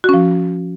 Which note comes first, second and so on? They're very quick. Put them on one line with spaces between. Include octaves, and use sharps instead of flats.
F#4 C#4 F3